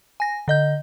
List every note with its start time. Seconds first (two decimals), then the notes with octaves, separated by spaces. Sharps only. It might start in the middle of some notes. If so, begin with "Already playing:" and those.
0.20 G#5 A#6
0.48 D3 D#5 G6